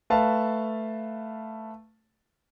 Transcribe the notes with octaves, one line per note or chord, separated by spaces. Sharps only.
A3 B4 F5 A5